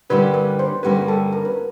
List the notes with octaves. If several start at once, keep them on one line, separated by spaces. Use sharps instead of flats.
G2 D3 G3 A#3 C#4 B4
B4
C5
G2 D3 G3 A#3 C#4 B4
A4
A#4
B4